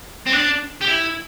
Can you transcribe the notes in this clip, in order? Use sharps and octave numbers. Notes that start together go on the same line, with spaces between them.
C4
D4
G4
E4